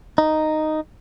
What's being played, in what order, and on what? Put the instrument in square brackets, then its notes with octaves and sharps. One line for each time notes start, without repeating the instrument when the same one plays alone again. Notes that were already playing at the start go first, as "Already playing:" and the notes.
[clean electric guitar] D#4